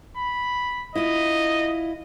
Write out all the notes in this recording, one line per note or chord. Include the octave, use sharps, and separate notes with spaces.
B5
E4 F4 D#5